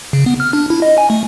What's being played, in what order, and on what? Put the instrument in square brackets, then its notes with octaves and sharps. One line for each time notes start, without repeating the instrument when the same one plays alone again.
[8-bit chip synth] C#3
B3
F6
D4
E4
D#5
G#5
A3